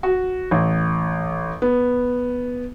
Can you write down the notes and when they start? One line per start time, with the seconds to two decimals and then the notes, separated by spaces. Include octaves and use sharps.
0.03 F#4
0.51 A1
1.62 B3